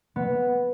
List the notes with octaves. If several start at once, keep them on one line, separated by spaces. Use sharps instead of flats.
B3